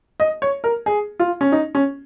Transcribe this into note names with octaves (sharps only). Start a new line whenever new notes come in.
D#5
C#5
A#4
G#4
F4
C#4
D#4
C#4